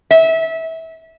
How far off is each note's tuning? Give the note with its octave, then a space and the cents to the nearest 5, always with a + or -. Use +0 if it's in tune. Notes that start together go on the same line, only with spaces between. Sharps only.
E5 -25